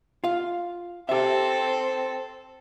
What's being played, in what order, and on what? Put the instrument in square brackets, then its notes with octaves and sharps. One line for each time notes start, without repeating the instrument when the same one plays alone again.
[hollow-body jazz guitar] F4 F5
[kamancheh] C4 A4 [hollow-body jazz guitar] G4 E5